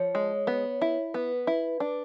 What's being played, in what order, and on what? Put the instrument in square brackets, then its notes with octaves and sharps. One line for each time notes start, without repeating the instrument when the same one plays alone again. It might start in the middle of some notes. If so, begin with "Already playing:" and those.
Already playing: [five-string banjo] F3 [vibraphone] C#5
[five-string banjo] G#3
B3
E4
[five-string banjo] B3 [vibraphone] B4
[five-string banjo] E4
D4